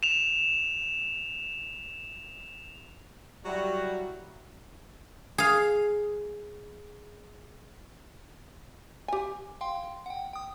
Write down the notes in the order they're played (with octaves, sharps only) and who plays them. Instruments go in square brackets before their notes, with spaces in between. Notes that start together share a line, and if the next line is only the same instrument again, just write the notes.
[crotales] E7 F7
[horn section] F#3 G3 E4 F#4
[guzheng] G#4 F5
[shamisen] G4 G#5
[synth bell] F5 G5 C6
F#5 G5
G5 D#6